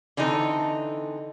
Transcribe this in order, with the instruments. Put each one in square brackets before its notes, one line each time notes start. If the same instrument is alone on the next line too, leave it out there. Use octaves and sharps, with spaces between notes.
[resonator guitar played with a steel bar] D3 E3 C4 D#4 A4